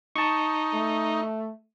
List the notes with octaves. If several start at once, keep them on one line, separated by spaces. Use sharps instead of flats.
D#4 A5 C#6
A3